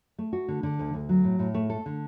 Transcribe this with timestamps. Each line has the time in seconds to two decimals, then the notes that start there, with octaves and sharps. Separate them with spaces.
0.18 A3
0.33 F#4
0.48 D3
0.63 D3
0.79 D2
0.94 D2
1.09 F#3
1.24 A2
1.39 A2
1.54 A3
1.70 A4
1.86 D3